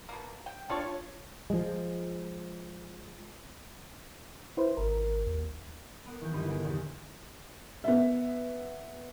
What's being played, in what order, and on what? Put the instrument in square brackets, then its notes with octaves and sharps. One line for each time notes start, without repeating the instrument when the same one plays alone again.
[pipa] B2 A#3
G5
[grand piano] D4 F4 C#5 [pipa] A4 D5
[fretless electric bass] F3 G#3
[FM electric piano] E4 B4 C5
[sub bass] G#1 [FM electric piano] A#4
[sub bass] D#2
[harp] B3 A#4 F#5
D#3 E3 G6
G1 D3 G3 D#4 B4 G6
G#4 A#4 F#5
A#1 E2 D#4 G4
[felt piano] B3 E5